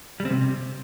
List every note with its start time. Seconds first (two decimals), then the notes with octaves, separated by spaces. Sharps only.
0.20 G3
0.25 C4
0.30 C3